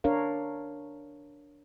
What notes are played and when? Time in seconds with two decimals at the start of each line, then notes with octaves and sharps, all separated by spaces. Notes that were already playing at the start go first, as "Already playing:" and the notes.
0.04 D4 A#4 C#5 F5